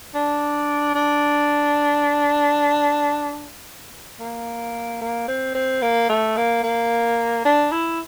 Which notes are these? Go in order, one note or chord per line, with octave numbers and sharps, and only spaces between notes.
D4
D4
A#3
A#3
C4
C4
A#3
A3
A#3
A#3
D4
E4